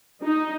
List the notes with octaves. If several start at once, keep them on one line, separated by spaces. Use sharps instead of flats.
D#4